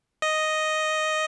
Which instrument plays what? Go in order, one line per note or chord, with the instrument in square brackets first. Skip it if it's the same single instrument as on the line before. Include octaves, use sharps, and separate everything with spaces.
[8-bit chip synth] D#5